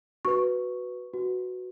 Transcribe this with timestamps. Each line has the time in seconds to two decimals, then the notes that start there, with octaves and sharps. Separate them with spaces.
0.25 F#4 B4 C#6
1.13 F#4 B4